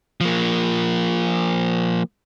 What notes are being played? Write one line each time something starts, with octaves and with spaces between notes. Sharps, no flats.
F3 A#3